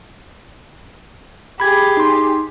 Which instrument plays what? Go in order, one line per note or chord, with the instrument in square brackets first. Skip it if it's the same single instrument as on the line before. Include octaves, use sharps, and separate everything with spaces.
[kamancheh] G4 G#4 [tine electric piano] B5 G#6
[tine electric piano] D#4 C6